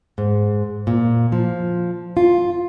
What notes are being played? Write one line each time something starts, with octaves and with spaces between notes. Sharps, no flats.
G#2
A#2
F3
F4